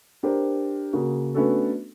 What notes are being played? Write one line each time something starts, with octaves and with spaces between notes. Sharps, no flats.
D4 G4 A#4 C5
C#3 A#3 F#4
A3 B3 C#4 D4 F#4 A4